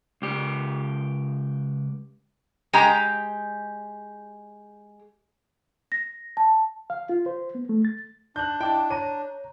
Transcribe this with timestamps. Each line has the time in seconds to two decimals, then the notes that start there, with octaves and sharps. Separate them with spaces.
0.22 C#2 G4
2.73 G#3 G4 A#5
5.92 A#6
6.37 A5
6.90 F5
7.09 F4
7.26 C5
7.55 B3
7.69 A3
7.85 A6
8.36 D4 F#6 G6
8.61 E4 D#5 G5 A5 D6
8.91 C#5 A#5 D#7